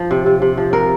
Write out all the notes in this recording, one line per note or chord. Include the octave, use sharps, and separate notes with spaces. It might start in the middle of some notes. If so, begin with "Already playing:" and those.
Already playing: F3
C3
C3
C3
F3
C3 A#4